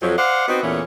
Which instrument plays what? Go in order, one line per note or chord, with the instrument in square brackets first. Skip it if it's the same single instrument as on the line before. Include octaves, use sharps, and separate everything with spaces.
[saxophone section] F2 F#3
C5 D5 F5 F#5
B3 C4 D#4 F#4
E2 A#2 E3 A3 B3 C#4